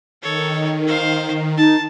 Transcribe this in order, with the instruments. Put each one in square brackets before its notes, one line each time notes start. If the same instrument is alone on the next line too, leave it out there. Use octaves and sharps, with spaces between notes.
[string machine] D#3 [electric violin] A4 C#5
[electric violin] C5 F5
[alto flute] D#4 [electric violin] A5